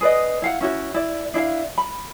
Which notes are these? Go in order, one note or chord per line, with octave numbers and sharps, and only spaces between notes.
G#4 B4 D5 D#5
E4 F5 F#5
C#4 E4 F#4 C#5
E4 D5
D4 E4 E5 F5
B5